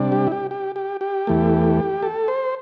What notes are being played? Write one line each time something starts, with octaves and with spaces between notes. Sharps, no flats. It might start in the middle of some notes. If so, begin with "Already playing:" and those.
Already playing: C3 G3 D4
G4
E4
G4
G4
G4
G4
E2 E3 A3
A4
C5